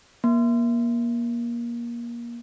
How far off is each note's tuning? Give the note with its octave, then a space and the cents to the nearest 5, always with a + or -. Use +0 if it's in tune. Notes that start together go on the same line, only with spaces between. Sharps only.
A#3 +25